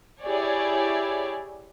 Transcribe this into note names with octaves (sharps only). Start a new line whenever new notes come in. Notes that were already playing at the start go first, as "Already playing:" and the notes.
E4 G4 G#4 C#5 D5